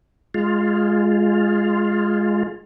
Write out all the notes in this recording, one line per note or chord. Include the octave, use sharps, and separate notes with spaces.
G#3 F4